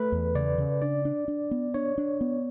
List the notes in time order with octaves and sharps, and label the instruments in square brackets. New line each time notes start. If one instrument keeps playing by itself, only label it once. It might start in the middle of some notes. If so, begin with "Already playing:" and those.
Already playing: [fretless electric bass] A3 [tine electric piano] A4 B4
[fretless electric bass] E2
[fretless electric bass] C#3 [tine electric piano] D5
[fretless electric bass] C#3
[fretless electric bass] D4 [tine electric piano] D5
[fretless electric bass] D4
D4
B3
[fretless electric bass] D4 [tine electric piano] C#5
[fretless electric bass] D4
B3